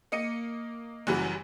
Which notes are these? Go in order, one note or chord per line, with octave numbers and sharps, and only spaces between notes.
A#3 D#5 C#7 D#7
F#1 F#2 E3 G3 F#4